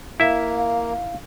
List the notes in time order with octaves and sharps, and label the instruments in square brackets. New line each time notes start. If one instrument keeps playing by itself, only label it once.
[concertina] A#3 [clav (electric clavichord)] E4 E5 [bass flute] F5